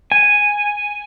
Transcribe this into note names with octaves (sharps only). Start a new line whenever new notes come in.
G#5